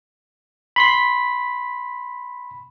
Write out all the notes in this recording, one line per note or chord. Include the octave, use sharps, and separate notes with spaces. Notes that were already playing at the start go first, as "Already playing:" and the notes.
B5 C6 B6